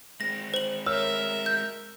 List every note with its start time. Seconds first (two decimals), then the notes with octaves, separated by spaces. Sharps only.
0.21 G#3 C4 A#6
0.54 C5 F#7
0.86 A#4 C#5 E5 E6 F6
1.46 G6